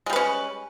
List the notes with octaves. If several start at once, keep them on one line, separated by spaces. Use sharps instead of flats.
G3 G#3 C#4 B4